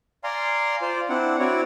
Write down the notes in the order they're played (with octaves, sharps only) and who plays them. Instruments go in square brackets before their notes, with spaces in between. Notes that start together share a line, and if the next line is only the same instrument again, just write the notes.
[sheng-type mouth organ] D5 F5 G#5 A#5 C6
F4 C5 D5
C4 D4 E4 F#5
C4 E4 F#4 C#5 D5